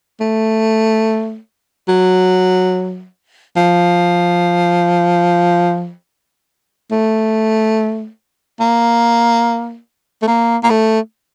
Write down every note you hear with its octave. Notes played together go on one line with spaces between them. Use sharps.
A3
F#3
F3
A3
A#3
A3
A#3
A#3
A3